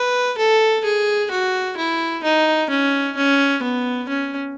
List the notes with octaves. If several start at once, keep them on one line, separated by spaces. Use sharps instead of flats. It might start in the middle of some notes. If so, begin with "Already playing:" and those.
Already playing: B4
A4
G#4
F#4
E4
D#4
C#4
C#4
B3
C#4